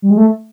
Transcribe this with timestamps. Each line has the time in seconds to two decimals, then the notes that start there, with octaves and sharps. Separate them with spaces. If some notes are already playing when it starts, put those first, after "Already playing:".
0.02 G3
0.10 G#3
0.17 A3